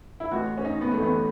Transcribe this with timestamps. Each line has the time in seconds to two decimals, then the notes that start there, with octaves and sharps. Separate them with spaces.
0.20 E4
0.31 A1 A2 E3 F#4
0.58 C#4
0.65 D#4
0.81 B3
0.91 A3
0.98 A1 A2 E3 B3